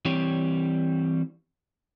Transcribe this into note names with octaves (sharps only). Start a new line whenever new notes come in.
E3 G3 C4 G4 C#5